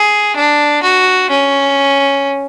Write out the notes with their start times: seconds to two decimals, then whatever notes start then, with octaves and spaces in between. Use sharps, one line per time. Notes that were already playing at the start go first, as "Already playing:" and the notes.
Already playing: G#4
0.36 D4
0.83 F#4
1.30 C#4